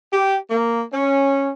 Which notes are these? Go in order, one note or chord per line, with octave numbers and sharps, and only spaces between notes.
G4
A#3
C#4